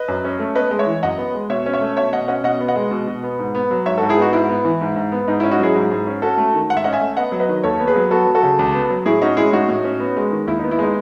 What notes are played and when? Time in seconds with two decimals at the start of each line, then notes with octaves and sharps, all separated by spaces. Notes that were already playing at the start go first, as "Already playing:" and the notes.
Already playing: B4 D#5
0.08 F#2
0.25 C#4
0.39 A3
0.55 B3 B4 D#5
0.71 G#3
0.79 C#5 E5
0.86 E3
1.03 F#2 D#5 F#5
1.18 B3
1.34 G#3
1.50 B2 C#5 E5
1.66 C#4
1.73 C#5 E5
1.81 A3
1.97 B2 C#5 E5
2.12 B2 D#5 F#5
2.28 C#4 D#5 F#5
2.44 B2 D#5 F#5
2.60 B3
2.68 D#5 F#5
2.76 G#3
2.91 B2
3.07 B2
3.23 B3
3.39 G#2
3.55 B3
3.71 F#3
3.86 G#2 C#5 E5
3.98 F#4 A4
4.02 G#2
4.09 E4 G#4
4.17 B3 D#4 F#4
4.33 G#2 E4
4.49 B3
4.65 E3
4.81 G#2
4.96 G#2
5.12 B3
5.28 G#2 D#4
5.40 E4
5.43 C#4
5.51 D#4 F#4
5.59 F#3 E4 G#4
5.75 G#2
5.91 G#2
6.07 C#4
6.22 C#4 F#4 A4
6.38 A3
6.54 D#3
6.69 G#2 F#5
6.77 E5
6.84 C#4 D#5 F#5
6.93 E5 G#5
7.01 A3
7.17 B3 D#5 F#5
7.32 F#3
7.40 B4 D#5
7.49 D#3
7.63 D#2 A4 C#5
7.80 B3
7.87 G#4 B4
7.96 F#3
8.11 B3 F#4 A4
8.27 F#3
8.35 F#4 A4
8.43 C#3
8.59 C#2
8.74 B3
8.90 F#3
9.06 A2 E4 G#4
9.22 C#4 D#4 F#4
9.37 G#3 E4 G#4
9.53 A2 D#4 F#4
9.69 A2
9.84 C#4
10.00 B3
10.17 G#3
10.32 D#3
10.47 D#2 E4
10.59 D#4
10.64 B3
10.71 E4
10.79 G#3 D#4